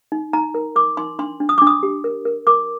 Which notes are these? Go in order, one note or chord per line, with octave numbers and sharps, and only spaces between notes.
D#4
D#4 A#5
A#4
A#4 D6
D#4 C6
D4 C6
D4
D#6
D4 D6
D#6
G4
A#4
A#4
A#4 D6